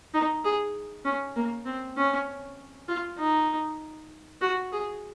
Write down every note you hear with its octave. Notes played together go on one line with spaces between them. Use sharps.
D#4
G#4
C#4
A#3
C4
C#4
F4
D#4
F#4
G#4